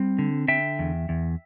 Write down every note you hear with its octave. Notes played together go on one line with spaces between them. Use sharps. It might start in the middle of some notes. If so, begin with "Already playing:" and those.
Already playing: G3 C4
D3
D3 E5 G5
E2
E2